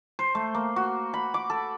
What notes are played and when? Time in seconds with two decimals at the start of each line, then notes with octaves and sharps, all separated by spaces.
0.19 C5
0.35 A3
0.55 A#3
0.76 F#4
1.14 B5
1.34 D6
1.50 A4